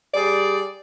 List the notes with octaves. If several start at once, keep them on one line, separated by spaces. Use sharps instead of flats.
G3 G#4 D5